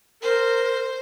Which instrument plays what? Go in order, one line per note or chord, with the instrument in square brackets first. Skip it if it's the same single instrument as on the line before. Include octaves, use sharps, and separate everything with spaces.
[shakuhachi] A#4 [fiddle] C5